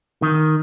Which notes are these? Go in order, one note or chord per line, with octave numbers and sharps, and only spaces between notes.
D#3